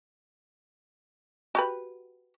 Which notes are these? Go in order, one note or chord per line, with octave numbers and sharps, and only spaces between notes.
F#4 G4 B4